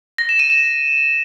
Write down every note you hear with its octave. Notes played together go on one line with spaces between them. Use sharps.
A#6
E7
D#7
E7